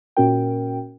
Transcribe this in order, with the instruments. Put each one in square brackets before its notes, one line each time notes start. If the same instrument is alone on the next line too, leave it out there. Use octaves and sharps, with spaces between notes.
[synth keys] A#2 C#4 F#4 A#4 G5